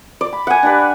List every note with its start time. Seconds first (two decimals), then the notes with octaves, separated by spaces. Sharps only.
0.21 D5
0.33 B5
0.47 F#5 G#5
0.63 D4 G4 B4